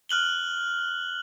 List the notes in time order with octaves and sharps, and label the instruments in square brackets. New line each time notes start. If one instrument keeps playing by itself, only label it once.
[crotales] F6 F#6 F#7 G7